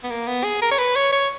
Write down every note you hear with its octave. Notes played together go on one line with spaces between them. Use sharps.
B3
A#3
B3
G#4
A#4
C#5
B4
C#5
C#5